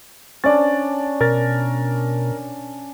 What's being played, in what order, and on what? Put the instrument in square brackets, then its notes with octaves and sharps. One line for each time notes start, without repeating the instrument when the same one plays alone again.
[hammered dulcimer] C#4 D4 [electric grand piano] D5 A6
[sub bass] B2 [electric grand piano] A#4 A6